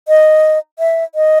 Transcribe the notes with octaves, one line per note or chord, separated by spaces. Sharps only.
D#5
E5
D#5